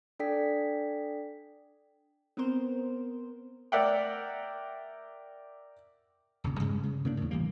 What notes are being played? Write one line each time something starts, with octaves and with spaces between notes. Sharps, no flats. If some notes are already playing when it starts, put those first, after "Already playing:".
D4 A4 D5 G5 B6
B3 C4 A#4 C5
A#4 D5 E5 F#5 G5
D#1 A#1 C#3
G2 C#3 G#3
C#3
C#3 A#3 C4 D4
E2 A2
C2 E3 G3 A#3